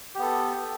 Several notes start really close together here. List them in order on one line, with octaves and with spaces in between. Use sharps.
G4 B3 A4